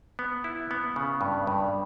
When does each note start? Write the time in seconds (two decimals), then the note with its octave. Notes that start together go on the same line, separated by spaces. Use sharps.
0.19 B3
0.44 E4
0.71 B3
0.96 C#3
1.21 G2
1.47 G2